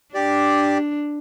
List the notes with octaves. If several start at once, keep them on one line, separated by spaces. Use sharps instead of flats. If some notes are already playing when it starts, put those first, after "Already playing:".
D4 G4 D5